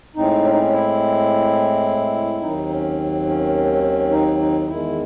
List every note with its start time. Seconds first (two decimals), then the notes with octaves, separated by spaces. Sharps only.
0.16 A2 G#3 C4 D#4
0.45 C#4
0.51 D#4
0.59 C#4
0.72 E4
2.42 D#2 D#3 F#3 C4 D#4
2.70 C#4
3.26 C#4
4.11 D#4
4.39 D#4
4.67 E2 D#3 G#3 E4